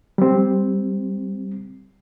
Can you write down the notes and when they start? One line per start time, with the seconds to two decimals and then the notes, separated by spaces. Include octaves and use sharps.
0.18 G3 C4